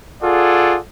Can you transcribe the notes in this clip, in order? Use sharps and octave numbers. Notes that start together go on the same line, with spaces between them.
F4 G#4 A4 D5 F#5